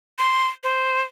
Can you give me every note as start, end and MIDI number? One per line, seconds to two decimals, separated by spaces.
0.19 0.47 84
0.64 1.02 72